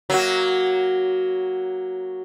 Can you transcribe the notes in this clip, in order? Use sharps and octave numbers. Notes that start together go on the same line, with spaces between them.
F#3 A#3 F#4